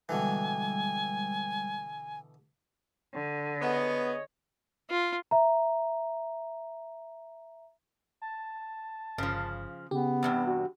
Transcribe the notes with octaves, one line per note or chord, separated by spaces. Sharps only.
B2 D3 E3 G3 G#3 G#5
D3
B3 G#4 C#5 D#5
F4
E5 A#5
A5
G1 C#3 F3
C#3 B3 G4
E2 G2 C3
F#4